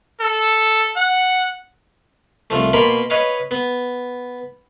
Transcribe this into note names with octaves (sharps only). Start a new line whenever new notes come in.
A4
F#5
C2 F3 A3
B2 A#3 A#4 B5 C6
B4 C#5 D#5 F5
B3